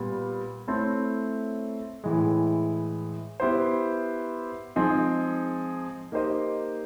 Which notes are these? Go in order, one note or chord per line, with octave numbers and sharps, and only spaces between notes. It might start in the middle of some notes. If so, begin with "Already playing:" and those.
Already playing: A#2 G3 B3
A3 C4 E4 A4 C#5
A2 E3 G#3
B3 E4 G4 C5
F3 G#3 C4 D#4 G#4
A#3 D#4 G4 C5 D#5